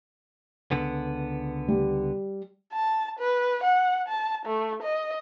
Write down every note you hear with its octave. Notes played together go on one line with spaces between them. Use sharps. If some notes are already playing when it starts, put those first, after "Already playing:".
C#2 D3 B3
G3
A5
B4
F#5
A5
A3
D#5